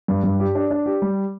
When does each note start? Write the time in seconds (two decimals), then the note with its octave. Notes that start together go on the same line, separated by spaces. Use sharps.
0.08 G2
0.24 G2
0.40 G4
0.55 D4
0.70 D4
0.86 G4
1.02 G3